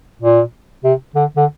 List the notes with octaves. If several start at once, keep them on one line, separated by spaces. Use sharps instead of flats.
A#2
C3
D3
D3